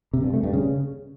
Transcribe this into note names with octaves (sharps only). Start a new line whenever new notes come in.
C3
G2
A3
G2
C#3